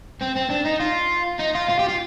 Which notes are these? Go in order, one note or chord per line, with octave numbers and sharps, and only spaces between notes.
C4
C4
D4
D#4
F4
D#4
F4
F4
G4
F4